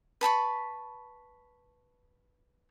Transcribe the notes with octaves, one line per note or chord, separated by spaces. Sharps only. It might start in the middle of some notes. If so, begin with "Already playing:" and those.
B4 A5 B5 C#6